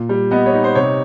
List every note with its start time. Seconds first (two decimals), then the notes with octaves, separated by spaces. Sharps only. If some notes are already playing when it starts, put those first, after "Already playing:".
Already playing: A#2
0.09 G3
0.31 B3 D#5
0.46 C#5
0.54 D#4
0.64 C5
0.75 C3 C#5